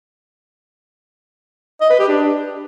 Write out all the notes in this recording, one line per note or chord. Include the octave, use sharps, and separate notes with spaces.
D#5
B4
G4
D4